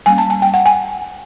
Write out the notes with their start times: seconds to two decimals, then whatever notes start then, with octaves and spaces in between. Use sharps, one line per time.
0.06 G3 A#3 C#4 G#5
0.18 A5
0.30 G#5
0.42 G5
0.54 F#5
0.66 G#5